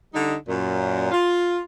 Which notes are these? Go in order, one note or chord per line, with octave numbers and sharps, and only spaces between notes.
D3 G3 D#4
F#2 A#2
F4